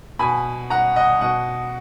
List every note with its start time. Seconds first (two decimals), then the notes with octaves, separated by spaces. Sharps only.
0.19 B2 G#5 B5
0.70 F#5 A#5
0.96 D#5 F#5
1.21 B2 D#5 F#5